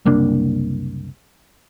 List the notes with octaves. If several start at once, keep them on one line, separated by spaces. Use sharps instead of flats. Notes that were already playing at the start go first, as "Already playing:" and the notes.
F#1 C2 A#3 D4